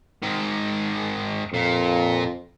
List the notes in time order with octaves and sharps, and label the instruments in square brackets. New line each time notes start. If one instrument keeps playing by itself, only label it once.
[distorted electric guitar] G#2 D#3
[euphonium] F2 [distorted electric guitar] A#2